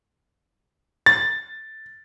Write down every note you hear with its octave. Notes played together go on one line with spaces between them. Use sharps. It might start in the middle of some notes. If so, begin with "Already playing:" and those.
A6